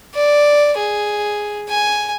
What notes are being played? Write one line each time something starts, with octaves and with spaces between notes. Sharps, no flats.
D5
G#4
G#5